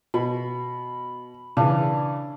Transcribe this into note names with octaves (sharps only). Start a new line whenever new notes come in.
B2 B5
C#3 E3 D4